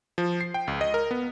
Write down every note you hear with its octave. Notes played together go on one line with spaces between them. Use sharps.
F3
C7
G5
C#2
D#5
A#4
B3